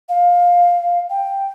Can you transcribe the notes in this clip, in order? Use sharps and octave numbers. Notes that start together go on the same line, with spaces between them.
F5
G5